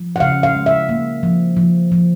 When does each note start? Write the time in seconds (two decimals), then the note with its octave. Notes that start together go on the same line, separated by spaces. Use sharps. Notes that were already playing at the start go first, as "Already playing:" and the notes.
Already playing: F3
0.16 F#5
0.20 C#3 F5
0.43 F5
0.54 G#3
0.66 E5
0.89 A#3
1.23 F3
1.57 F3
1.92 F3